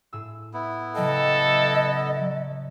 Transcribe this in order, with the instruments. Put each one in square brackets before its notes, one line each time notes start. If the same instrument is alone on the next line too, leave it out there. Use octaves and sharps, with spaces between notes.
[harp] A2 G#4 E6
[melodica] B3 E4
[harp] C#3 F#3 G5 [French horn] A4 [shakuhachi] D#5
[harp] F#3